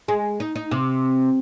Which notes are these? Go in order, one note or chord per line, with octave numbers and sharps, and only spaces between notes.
G#3
D#4
D#4
C3